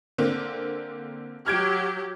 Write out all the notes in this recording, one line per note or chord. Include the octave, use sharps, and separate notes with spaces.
D3 A#3 C4
F#3 G4 F6 G#6 D7